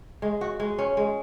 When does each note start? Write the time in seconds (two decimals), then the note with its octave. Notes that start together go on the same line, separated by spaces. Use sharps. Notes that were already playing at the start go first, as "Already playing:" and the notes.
0.22 G#3
0.41 F#4
0.60 G#3
0.78 C#4
0.97 G#3